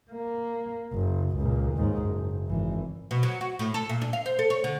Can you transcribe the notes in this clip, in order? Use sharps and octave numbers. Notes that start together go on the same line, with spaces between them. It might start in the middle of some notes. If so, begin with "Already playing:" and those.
A#3
F#1
C#2 A#2
D#2 G#2
F#1
G#1 E3
B2
F#3
F#4
A2
A4
A#2
D4
F5
C5
A4
C#5
D3